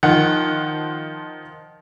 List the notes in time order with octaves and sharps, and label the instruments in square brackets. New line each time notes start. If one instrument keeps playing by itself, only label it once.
[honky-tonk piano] D#3 F3 F#5